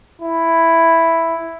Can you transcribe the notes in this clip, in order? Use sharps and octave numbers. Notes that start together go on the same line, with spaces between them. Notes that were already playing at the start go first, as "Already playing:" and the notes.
E4